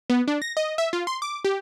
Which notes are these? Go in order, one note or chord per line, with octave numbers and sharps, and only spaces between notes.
B3
D4
A#6
D#5
E5
F4
C6
D6
G4